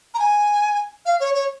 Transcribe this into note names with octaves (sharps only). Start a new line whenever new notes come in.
A#5
G#5
F5
C#5
C#5